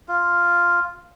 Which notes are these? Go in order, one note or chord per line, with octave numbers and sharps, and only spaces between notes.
F4